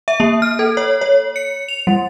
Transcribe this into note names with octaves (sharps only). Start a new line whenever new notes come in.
E5
A#3
F6
A4
C#5
C#5
C#7
F7
G3